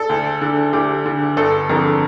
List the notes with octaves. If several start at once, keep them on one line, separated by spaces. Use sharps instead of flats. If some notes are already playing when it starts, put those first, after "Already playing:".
Already playing: A4
D2
D3
D2 G4
D3
G1 A4
F2 D3 A#4